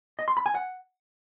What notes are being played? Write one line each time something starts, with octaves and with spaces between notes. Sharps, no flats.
D#5
C6
B5
G#5
F#5